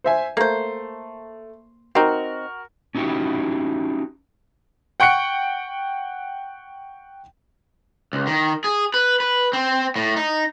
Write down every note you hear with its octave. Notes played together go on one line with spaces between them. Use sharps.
C5 E5 G#5
A3 A#3 C5
C4 D#4 F#4 A#4
C#4 D#4 E4 F#4 G4
F#5 G5 C#6 F#6 C#7 D7
C#2
D#3
G#4
B4
B4
C4
A2
D#4